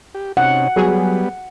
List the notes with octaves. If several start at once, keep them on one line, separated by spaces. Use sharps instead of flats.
G4
C3 C#4 D#4 F#5
F#3 G3 B3 G#4